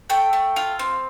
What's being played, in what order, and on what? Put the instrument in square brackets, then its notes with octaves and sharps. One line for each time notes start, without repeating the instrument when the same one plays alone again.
[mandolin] A3 G5
A3
F4
C4